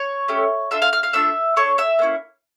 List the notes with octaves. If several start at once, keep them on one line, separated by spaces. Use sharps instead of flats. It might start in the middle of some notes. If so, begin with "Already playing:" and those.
Already playing: C#5 C#6
A3 C#4 G4
D4 F4 A4 E5 E6
F5 F6
F5 F6
F5 F6
A3 D4 F4 E5 E6
D4 A4 C#5 C#6
E5 E6
A#3 C#4 E4